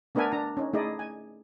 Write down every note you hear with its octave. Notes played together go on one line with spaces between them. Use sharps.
A3 B3 D4 A#4 E5 G#5
D4 A#5
C#4 D#4
A3 D#4 E4 G#4 D5 D#5
G#5